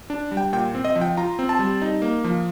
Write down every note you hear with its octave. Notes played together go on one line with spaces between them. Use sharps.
D4
G3
G5
A#2 G5
C4
D#5
F3
G5
F4 A#5
C4
A5
G3
D#4
A#3
F3